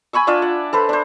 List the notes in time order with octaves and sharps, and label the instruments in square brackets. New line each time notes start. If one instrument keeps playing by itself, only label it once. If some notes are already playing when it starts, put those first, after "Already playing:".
[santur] G#5 B5 C#6 E6
D4 F4 D5 E5
F#5
A4 B4 C5
D4 C5